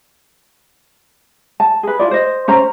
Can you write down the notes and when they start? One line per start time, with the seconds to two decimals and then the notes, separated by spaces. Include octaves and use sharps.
1.60 A5
1.83 G#4 B4
1.99 E4 F4 D5
2.11 C5 D#5
2.48 C#4 C5 A#5